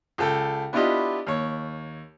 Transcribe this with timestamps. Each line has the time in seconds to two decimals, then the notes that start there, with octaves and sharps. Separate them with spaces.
0.18 C#2 A4 G5
0.73 B3 D4 E4 F4 G4 D#5
1.27 D#2 C#5